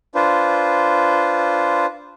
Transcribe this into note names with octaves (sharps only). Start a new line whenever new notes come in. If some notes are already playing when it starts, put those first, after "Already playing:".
D4 F4 B4 C5